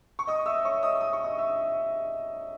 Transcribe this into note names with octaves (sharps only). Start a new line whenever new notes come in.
C#6
D#5 D#6
E5 E6
C#5 C#6
D#5 D#6
D#6
C#6
D#5 D#6
E5 E6